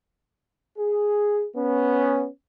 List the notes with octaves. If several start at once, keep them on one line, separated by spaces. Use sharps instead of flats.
G#4
B3 C#4